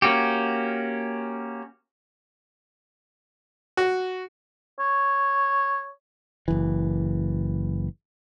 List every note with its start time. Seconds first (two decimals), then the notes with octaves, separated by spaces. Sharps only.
0.02 A#3 C#4 F#4 G4
3.77 F#4
4.79 C#5
6.48 F#1 E3